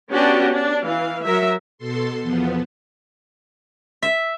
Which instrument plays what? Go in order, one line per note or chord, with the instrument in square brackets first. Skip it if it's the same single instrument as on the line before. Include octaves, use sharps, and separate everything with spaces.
[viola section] B3 C#4 D4 F#4 G4
D4
E3 F5
F#3 A#4 E5
[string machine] B2 A4 C6
E2 F3 B3
[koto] E5